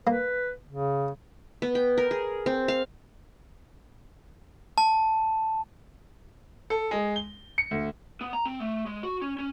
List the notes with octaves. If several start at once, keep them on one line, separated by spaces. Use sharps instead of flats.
A#3 B4
C#3
B3
G5
A#4
G#4
C4
F5
A5
A4
G#3
G7
C#7
D2
B3
A#5
C4
A3
G#3
F#4
C#4
C#4